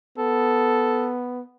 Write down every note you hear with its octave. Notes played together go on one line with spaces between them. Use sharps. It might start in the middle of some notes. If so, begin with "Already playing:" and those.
B3 A4